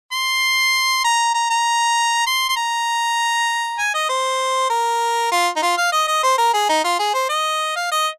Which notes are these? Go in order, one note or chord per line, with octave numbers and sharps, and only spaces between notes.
C6
A#5
A#5
A#5
C6
C6
A#5
G#5
D#5
C5
A#4
F4
D#4
F4
F5
D#5
D#5
C5
A#4
G#4
D#4
F4
G#4
C5
D#5
F5
D#5